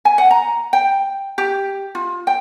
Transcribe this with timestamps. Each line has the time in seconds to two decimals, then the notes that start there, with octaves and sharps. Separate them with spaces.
0.05 G#5
0.18 F#5
0.31 A#5
0.73 G5
1.38 G4
1.95 F4
2.27 G5